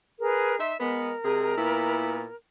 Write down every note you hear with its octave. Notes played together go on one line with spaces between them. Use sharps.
G#4 A#4 B4
D#4 E5 C6
G#3 B3 A#4
C3 G#3 G#4
A#2 B3 E4